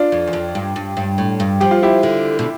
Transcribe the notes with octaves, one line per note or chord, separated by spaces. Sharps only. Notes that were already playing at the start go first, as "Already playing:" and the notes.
Already playing: D4 F4
F2
E2
F2
G2
G2
G2
A2
G2
F3 G4
F4
E4 G4
D3
B2